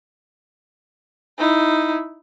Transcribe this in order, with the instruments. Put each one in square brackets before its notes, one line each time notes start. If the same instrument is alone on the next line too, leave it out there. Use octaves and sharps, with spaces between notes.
[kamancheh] D#4 E4